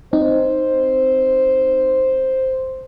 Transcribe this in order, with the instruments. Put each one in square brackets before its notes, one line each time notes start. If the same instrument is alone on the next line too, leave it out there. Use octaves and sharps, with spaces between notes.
[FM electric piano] C4 D#4 [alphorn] C5